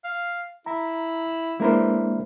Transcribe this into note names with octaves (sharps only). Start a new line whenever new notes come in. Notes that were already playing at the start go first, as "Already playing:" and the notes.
F5
E4 A#5
E3 G#3 A#3 D4 E4 A#4 C5